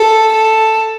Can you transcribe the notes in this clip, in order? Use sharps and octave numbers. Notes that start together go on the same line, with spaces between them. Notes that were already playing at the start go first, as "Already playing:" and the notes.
Already playing: A4
A4